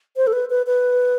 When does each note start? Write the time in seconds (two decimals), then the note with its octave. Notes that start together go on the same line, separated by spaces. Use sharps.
0.17 C5
0.27 A4
0.33 B4
0.50 B4
0.67 B4